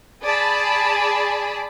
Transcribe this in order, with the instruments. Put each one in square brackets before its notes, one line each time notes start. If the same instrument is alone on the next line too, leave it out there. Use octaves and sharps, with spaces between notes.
[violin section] G#4 D5 A5 B5